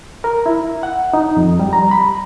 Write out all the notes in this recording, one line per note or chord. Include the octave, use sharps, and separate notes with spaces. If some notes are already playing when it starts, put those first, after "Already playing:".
A#4
E4
F#5
D#4
F2
G3
A#5
B5